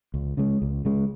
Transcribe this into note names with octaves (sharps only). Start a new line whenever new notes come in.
C#2
C#3 G#3
C#2
C#3 G#3